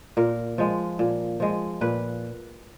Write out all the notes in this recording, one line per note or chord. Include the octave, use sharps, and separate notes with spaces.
A#2 A#4
F3 G#3
A#2
F3 G#3
A#2 B4